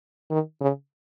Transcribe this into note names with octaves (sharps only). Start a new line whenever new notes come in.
D#3
C#3